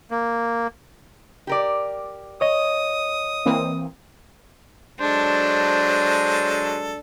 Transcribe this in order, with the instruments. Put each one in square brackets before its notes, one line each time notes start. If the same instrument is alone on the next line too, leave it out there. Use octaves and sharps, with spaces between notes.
[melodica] A#3
[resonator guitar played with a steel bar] G4 A#4 D5
[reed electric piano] C#5 D#5 [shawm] D#6
[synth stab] E3 A#3 C4
[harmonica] F#3 G#3 A4 [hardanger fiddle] D4 [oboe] C5